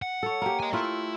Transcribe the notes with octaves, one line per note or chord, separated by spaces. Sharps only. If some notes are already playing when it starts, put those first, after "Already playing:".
F#5
A4 C#5
A#3 G4
D#5 G#5
A3 E4 F4